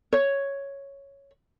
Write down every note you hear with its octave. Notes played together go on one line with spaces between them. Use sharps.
C#5